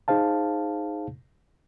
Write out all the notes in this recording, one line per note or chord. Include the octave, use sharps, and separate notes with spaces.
D#4 G#4 C5 F5 A5